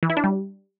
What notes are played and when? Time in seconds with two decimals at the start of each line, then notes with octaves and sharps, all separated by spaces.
0.03 E3
0.10 E4
0.17 D4
0.24 G3